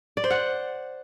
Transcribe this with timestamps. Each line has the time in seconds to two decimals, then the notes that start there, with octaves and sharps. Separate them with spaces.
0.17 D5
0.24 C5
0.30 F#5